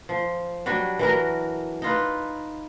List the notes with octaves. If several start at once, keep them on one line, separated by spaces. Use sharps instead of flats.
F3
F#3 G3 D4
E3 F#3 A#4
D#4 F4 B4